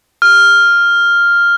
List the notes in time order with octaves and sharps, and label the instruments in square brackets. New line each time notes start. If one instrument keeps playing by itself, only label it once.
[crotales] F6